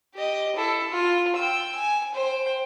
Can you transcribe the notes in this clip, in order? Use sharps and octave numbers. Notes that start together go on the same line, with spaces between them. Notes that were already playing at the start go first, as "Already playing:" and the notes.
G4 D#5
E4 A4
F4
G5 E6
G#5
C5 G5